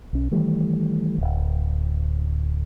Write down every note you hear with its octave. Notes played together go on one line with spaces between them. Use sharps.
B1 C#4
D#3 E3 G3 A3
D1 G1